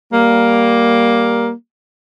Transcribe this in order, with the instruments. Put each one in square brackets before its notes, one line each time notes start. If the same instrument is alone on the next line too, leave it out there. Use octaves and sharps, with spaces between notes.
[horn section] G3 A#3